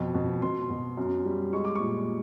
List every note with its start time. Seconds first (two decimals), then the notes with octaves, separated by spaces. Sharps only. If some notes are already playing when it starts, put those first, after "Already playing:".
Already playing: F2 B2
0.14 B2
0.42 B2 C6
0.70 B2
0.97 F#2
1.25 G3
1.53 G#3 C#6
1.65 D6
1.75 A#2 C#6